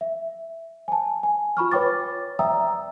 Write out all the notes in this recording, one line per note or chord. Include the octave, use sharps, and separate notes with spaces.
E5
G#5 A5
G#5
F4 B5 C#6 F6
B4 C#5 G5 D6 A6
D5 E5 G5 A#5 D#6 E6